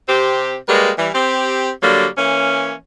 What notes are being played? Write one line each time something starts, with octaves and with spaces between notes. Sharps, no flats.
C3 C4 G4
G3 G#3 A#3 B4
E3 G3
C4 G4
D3 F#3 G3 A#3
E3 A#3 C#4